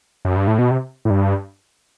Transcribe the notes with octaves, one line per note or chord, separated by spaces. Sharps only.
F#2
G2
A2
B2
C3
A2
G2